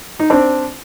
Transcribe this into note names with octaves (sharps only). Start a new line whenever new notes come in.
D#4
C4 D4